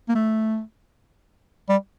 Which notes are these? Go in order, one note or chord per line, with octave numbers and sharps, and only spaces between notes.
A#3
A3
G3